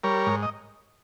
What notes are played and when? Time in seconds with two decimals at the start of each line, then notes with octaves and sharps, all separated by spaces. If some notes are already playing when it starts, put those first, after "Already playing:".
0.04 G3 A#4 C#5
0.26 G#2
0.43 D#5